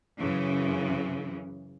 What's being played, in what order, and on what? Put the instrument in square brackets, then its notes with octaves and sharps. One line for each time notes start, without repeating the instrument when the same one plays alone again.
[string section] F#2 C#3 E3